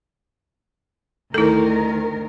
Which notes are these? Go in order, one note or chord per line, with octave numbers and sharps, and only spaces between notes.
D2 D#3 E4 A4 A#4